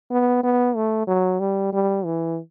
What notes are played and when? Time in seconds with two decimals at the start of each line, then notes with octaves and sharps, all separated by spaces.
0.11 B3
0.43 B3
0.76 A3
1.07 F#3
1.40 G3
1.73 G3
2.05 E3